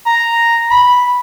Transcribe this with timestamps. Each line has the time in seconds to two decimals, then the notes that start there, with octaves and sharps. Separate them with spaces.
0.06 A#5
0.71 B5